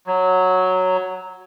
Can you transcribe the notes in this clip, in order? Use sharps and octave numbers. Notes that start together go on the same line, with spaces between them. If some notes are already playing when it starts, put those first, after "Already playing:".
F#3